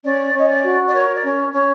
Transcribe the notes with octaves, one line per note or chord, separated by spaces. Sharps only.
C#4 D5
C#4 D#5
D5
F#4
D5
A#4 C#5
D5
C#4 C#5
C#4 C#5